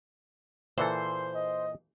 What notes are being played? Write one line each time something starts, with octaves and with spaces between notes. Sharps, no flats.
A#2 E3 A4 C5
D#5